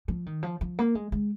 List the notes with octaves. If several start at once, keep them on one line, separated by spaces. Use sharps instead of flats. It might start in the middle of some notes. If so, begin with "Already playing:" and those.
F3
D#3
F3
F3
A#3
G#3
G#3